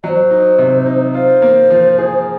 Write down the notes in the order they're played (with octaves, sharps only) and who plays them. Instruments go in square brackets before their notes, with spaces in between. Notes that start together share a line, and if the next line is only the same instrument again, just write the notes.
[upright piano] F#3 [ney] C5 D#5
[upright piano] D#4
C3
D#4
[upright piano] F4 [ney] C5
[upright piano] A#3
F3
G#4